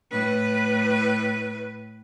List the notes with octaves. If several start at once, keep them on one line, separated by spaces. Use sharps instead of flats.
A2 B4